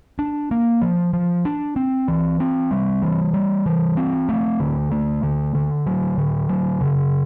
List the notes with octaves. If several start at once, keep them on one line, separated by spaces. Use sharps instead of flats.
D4
A#3
F3
F3
D4
C4
E3
C4
G3
E3
G3
E3
C4
A3
D3
A3
D3
D3
F#3
D3
F#3
C#3